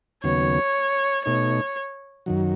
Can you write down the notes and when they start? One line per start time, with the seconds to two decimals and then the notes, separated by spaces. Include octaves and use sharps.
0.24 D#2 C#3 F#3 B3 C#5
1.25 B2 A3 D#4 C#5
2.26 F#2 D#3 F#3